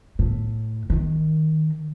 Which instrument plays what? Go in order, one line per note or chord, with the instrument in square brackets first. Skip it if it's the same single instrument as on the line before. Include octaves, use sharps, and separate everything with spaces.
[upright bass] A2
D#3